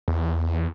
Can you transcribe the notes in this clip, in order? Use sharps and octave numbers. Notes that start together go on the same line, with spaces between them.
E2